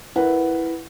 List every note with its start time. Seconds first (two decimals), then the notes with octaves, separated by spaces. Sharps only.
0.16 E4 A#4 B4 F#5